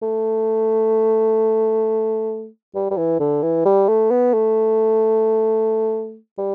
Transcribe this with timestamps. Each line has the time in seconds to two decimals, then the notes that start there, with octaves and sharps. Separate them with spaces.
0.02 A3
2.75 G3
2.91 G3
2.98 E3
3.20 D3
3.43 E3
3.66 G3
3.89 A3
4.11 B3
4.34 A3
6.38 G3